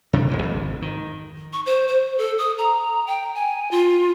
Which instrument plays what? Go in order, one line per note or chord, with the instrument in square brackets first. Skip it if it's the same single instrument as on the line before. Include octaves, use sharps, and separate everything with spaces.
[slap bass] C3 D#3 D4
D#1 F2 E3
G#1 F2
D#3
[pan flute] C#6
C5
C5
A4
D#6
A#5
G5
G#5
F4